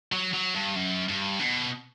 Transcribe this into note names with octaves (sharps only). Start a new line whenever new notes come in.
F#3
F#3
G2
F#2
G2
B2